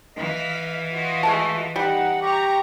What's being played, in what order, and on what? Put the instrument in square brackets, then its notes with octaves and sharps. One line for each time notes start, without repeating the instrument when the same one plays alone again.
[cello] E3 [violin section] D#5 F5 B6
[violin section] F4 F#4 D#5
[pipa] G#3 A3 A5
[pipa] G3 [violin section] D#4 [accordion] F#5
[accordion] G4 [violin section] A#5 C#6